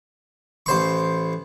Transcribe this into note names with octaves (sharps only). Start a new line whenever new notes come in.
A1 C5 C#6